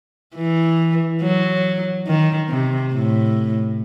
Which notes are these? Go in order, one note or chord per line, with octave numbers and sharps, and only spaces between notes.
E3
F#3
D#3
C3
A2